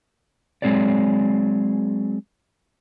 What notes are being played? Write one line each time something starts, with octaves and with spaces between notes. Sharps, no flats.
F#3 G#3 C4 G#4 C#5 D5